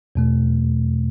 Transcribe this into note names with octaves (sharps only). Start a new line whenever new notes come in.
E2 B2 A3